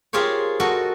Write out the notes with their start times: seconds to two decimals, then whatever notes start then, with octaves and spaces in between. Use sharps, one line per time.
0.13 F4 G4 G#4 A#4 C5 C#5
0.60 F#4 A4 A#4 D#5